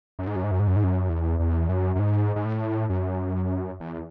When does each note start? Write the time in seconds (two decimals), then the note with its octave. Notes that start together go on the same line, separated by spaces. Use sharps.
0.19 F#2
0.27 G#2
0.36 F#2
0.44 G#2
0.51 F#2
0.60 G#2
0.67 F#2
0.76 G#2
0.84 F#2
1.09 E2
1.40 E2
1.69 F#2
1.96 F#2
1.99 G#2
2.36 G#2
2.45 A2
2.90 F#2
3.80 E2